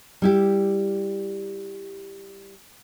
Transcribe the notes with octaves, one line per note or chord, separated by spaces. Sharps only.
G3 E4 G4